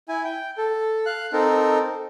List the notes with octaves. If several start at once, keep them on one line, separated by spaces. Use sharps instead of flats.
E4 G#5
G5
A4
F5 F#6
C4 D#4 A4 A#4